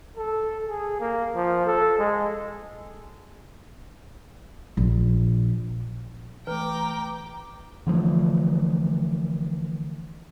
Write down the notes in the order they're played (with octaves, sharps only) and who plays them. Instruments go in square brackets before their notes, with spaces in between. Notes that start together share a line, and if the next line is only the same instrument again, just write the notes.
[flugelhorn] A4
G#4
A#3
F3
A4
G#3
[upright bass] A#1
[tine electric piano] E3 A3 [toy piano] B4 [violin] G5 D6 [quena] A#5
[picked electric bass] D3 E3 F3 A3